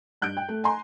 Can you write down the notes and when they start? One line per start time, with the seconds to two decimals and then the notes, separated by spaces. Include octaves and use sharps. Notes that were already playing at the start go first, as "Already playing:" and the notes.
0.22 G2 F#6 G6 D7
0.37 G5
0.49 A3
0.64 G#5 A#5 C6